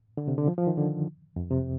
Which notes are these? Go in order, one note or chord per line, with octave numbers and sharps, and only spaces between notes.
D3
C3
D3
F3
F3
D#3
D3
F2
C3